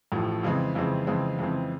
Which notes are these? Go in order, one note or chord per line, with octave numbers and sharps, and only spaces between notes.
A1 A2 F3
F2 C#3 E3 G#3 C4
F2 C#3 E3 G#3 C4
F2 C#3 E3 G#3 C4
F2 C#3 E3 G#3 C4